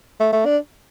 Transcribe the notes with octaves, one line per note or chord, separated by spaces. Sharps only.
A3
A3
D4